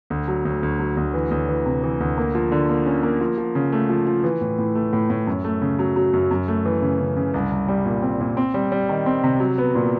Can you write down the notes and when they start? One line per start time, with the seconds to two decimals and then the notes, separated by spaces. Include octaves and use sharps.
0.10 D2
0.28 F#3
0.45 D2
0.63 D2
0.79 F#3
0.97 D2
1.14 E3
1.31 D2
1.49 E3
1.66 C3
1.84 E3
2.00 D2
2.17 A#3
2.35 F3
2.52 D3
2.69 A#3
2.86 C#4
3.03 A#3
3.21 F3
3.38 F3
3.55 C#3
3.72 A3
3.90 F3
4.07 F3
4.24 E3
4.41 A2
4.58 A2
4.75 A3
4.93 A2
5.10 A2
5.27 F#2
5.44 A3
5.62 C#3
5.79 F#3
5.96 F#3
6.13 F#2
6.31 F#2
6.48 A3
6.66 E3
6.82 C#3
7.00 C#3
7.17 C#3
7.34 C2
7.51 C2
7.68 G3
7.86 A#2
8.02 C4
8.21 A#2
8.37 C4
8.54 G3
8.72 G3
8.89 D#3
9.06 C4
9.24 C3
9.40 F#3
9.58 B3
9.75 A#2